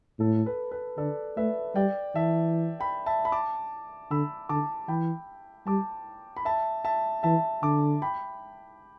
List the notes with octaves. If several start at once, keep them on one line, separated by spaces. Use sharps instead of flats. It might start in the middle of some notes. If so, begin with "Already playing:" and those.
A2 A4
B4
B4
D3 A4 D5
A3 B4 E5
G3 D5 G5
E3 E5 A5
G5 B5
E5 A5
B5
A5 D6
D3 B5 E6
D3 A5 D6
E3 G5 B5
G3 A5 D6
B5
E5 A5
E5 A5
E3 E5 A5
D3 A5 D6
G5 B5